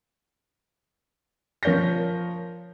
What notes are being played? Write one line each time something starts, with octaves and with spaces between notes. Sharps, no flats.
F3 A#4 C#5 G6 A#6